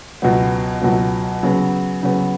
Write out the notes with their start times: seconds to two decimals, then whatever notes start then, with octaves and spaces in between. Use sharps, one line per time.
0.22 C#2 B2 F#3 B3
0.82 C#2 B2 F#3 B3
1.43 C#3 F#3 B3
2.03 C#3 F#3 B3